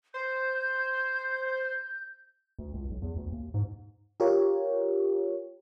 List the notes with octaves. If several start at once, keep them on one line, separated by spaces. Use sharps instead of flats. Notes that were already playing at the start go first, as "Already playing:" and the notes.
C5 G6
D2
C#2
B1
E2
D2
D#2
G#2
F4 G4 A#4 C#5